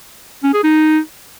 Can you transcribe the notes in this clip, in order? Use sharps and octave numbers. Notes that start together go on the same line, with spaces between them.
C#4
G#4
D#4